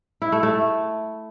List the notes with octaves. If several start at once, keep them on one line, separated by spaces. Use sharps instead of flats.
E4
A3
A3